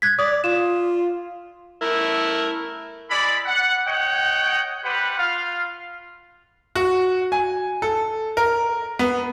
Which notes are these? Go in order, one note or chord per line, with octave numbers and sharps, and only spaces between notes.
F#6 G#6 B6
D5 D#6
F4 E7
A3 E4 A#4
G#3 E4 D5 B5
F#5
C#5 D#5 F#5 G5
G3 G4 B4 C5 F#5
F4 F5
F#4
G#5
A4
A#4
B3